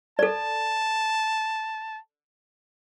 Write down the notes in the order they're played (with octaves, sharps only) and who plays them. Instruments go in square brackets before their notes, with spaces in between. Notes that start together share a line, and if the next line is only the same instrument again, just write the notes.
[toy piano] A4 D5 [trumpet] A5